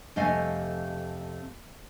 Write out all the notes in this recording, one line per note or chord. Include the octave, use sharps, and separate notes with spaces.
F2 C3 A3 D#5 F5 G#5